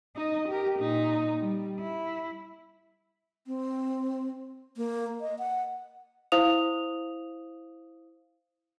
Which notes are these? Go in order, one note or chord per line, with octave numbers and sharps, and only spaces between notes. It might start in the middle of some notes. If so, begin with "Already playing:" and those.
D#4 D#5
G4 A#4
A#2 D#4
G3
E4
C4
A#3
D#5
F#5
E4 C5 F5 D#6 F7